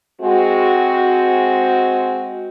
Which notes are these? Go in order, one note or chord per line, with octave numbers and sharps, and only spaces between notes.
G#3 C4 F#4